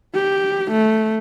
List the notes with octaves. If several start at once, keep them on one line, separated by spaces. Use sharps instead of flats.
G4
A3